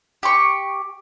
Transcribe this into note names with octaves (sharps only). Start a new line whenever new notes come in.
G4 C#6